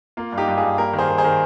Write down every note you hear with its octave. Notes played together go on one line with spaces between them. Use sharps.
A#3 F4
G2
D#4 G4
G2
F4 G#4
G2
A#3 G4 A#4
D#3
G#4 C5
D#3
G#4 C5
D#3